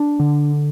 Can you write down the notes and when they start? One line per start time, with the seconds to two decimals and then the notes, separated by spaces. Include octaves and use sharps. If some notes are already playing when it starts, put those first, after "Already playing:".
Already playing: D4
0.20 D3